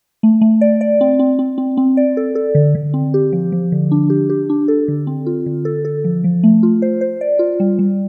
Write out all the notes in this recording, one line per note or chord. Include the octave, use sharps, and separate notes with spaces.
A3
A3
D5
D5
C4
C4
C4
C4
C4
D5
A4
A4
D3
D3
C4
G4
F3
F3
D3
D4
G4
G4
D4
A4
D3
C4
F4
D3
A4
A4
F3
F3
A3
F4
C5
C5
D5
F4
G3
G3